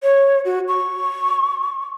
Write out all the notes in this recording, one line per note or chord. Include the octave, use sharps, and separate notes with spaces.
C#5
F#4
C#6